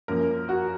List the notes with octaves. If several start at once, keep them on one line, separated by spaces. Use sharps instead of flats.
F#2 F3 A#3 A#4
F#4